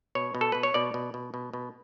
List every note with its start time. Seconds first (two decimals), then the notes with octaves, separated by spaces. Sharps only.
0.15 B2 C#5
0.35 B2
0.41 A4
0.52 B2 B4
0.63 C#5
0.74 B2 D5
0.94 B2
1.14 B2
1.34 B2
1.53 B2